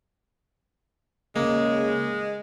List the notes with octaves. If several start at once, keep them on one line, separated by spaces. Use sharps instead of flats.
C#3 G#3 A#3